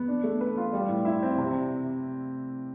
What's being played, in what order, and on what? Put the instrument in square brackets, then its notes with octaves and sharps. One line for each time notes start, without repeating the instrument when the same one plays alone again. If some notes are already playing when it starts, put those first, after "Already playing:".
Already playing: [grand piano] B3
D4
A3
B4
F4
G3
A2
E4
C4
C3